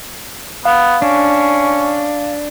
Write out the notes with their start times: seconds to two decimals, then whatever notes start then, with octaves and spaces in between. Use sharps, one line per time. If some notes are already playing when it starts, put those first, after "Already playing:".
0.65 B3 F5
1.02 C#4 D4